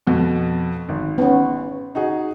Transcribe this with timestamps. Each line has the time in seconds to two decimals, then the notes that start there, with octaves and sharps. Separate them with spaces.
0.07 F2 B2
0.89 G#1
1.18 B3 C#4
1.95 D#4 F#4 G#4